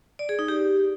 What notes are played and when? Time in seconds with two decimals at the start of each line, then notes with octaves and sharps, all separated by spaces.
0.19 D5
0.29 G#4
0.39 D#4
0.48 G4